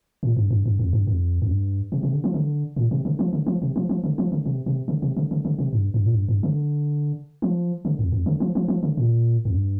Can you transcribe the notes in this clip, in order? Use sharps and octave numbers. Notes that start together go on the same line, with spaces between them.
A#2
G2
G2
G2
F2
G2
F2
F2
G2
C3
C3
D3
F3
D3
A#2
C3
D3
F3
D3
F3
C3
F3
F3
D3
F3
D3
C3
C3
D3
C3
D3
D3
D3
C3
G2
G2
A#2
G2
G2
D3
F3
D3
F2
F2
D3
F3
F3
F3
D3
A#2
F2
G2